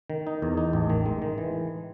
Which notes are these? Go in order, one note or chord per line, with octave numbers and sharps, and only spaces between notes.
D#3
D#4
E2
D#4
A1
D#3
G#3
D#3
E3